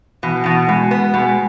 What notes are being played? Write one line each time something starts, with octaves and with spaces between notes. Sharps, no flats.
B2 E3
B2
B2 G#3
B3
B2 G#3